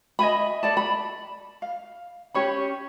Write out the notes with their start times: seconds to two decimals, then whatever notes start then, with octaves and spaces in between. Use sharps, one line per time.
0.19 D#5 E5 G#5 B5
0.63 A4 D5 A5
0.77 B5
1.62 F5
2.34 C#4 G4 C#5 B5